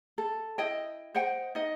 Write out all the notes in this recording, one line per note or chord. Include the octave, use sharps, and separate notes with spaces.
A4
E4 D#5 G5
C5 D#5 F#5 G5
D#4 D#5